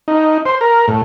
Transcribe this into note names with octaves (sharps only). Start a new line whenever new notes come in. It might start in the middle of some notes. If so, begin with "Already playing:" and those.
D#4
C5
A#4
A2